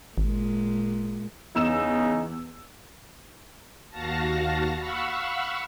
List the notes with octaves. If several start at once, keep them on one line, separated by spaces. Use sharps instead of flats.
G#1 A#2 G#3
E2 C#3 D#4 G#4 E6 E7
D#2 F#4 F5 A5 A#6
F5 F#5 B5 C#6 E6